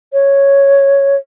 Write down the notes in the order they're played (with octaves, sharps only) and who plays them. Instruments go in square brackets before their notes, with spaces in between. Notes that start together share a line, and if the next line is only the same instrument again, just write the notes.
[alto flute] C#5